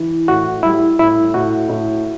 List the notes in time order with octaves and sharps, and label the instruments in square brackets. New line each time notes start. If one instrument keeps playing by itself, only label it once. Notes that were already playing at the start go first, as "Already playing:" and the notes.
Already playing: [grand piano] E3
[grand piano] A2 [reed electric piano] F#4
[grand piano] G3 [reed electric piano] E4
[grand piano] A2 [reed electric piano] E4
[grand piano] A2 [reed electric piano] F#4
[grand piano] A2